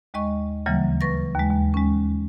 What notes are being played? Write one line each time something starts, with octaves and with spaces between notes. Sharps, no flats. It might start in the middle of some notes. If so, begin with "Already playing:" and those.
D#2 G#3 D#5 C#6
D2 C#3 E3 F#3 G3 A#3
B4 C#6 A6 A#6
D#2 G#3
D#2
G#3 C#4